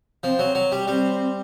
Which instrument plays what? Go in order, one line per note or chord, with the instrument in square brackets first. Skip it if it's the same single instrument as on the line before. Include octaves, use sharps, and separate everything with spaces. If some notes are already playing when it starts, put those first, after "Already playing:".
[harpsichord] F3 [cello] C4
[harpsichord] F#3
F#3
G3
[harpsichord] G3 [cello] C4